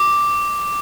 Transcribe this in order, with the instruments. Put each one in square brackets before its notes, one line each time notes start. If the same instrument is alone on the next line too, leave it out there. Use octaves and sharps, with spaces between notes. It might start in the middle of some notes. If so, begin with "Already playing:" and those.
Already playing: [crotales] D6